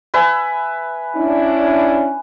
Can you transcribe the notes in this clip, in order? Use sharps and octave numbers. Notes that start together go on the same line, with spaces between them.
B4 E5 G#5
C#4 D4 E4